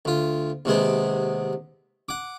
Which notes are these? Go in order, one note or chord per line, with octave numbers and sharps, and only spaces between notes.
D2 F4
D#2 C3 G#3 B3
F#5 D6